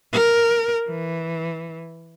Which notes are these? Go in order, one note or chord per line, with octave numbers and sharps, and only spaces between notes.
A#4
E3